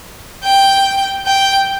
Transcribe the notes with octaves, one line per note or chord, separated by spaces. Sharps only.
G5
G5